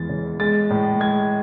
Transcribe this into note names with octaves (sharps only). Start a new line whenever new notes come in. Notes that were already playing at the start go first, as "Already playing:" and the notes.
Already playing: E2 E3 G#3 A6
C#3
G#3 A6
A2
G#3 G#6